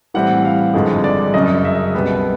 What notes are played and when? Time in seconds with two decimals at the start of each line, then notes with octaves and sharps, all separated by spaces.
0.14 A2 E3 G3 C4 F#5
0.45 F5
0.74 G#1 G2 D3 F3 G#3
1.04 D5
1.34 F#2 C#3 F#3 D#5
1.65 E5
1.94 C2 B2 G3 B3